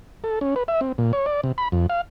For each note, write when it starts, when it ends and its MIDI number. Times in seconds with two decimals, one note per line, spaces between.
0.24 0.39 69
0.41 0.55 61
0.56 0.63 71
0.68 0.80 76
0.81 0.92 60
0.98 1.12 46
1.13 1.26 73
1.26 1.41 74
1.43 1.52 48
1.58 1.68 83
1.72 1.87 41
1.90 2.01 77